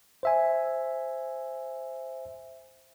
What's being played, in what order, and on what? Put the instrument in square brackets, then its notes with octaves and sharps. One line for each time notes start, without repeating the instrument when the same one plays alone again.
[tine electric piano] C5 E5 G#5